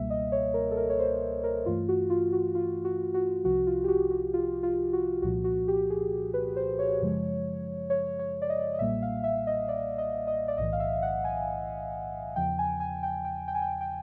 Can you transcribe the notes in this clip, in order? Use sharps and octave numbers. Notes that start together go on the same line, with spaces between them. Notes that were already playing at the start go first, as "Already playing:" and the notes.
Already playing: C#2 B2 G3 A#3 E5
D#5
C#5
A#4
A4
A#4
C#5
C5
A#4
G2 E3 A3 F4
F#4
F4
F#4
F4
F#4
F#4
C2 C3 F3 F#4
F4
G4
F#4
F#4
F4
F4
F#4
C2 A#2 F3 F#4
F#4
G4
G#4
B4
C5
C#5
F#2 C#3 F3 G#3
C#5
C#5
D5
D#5
D#5
B1 A#2 G3 A#3 E5
F5
E5
D#5
D5
D#5
D#5
D5
B1 A2 E3 D#5
F5
E5
F#5
G#5
E2 C#3 F3 G5
G#5
G#5
G5
G5
G5
G#5
G5
G5